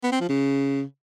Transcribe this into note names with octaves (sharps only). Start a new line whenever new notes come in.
B3
C4
F3
C#3